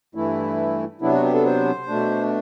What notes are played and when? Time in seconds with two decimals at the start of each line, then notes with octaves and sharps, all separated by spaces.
0.15 G2 E3 A3 E4
1.01 C3 F#3 B3 D4 E4
1.12 F#4
1.23 G4
1.34 A4
1.45 C5
1.88 B2 A3 D4